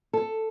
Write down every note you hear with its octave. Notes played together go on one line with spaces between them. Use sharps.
A4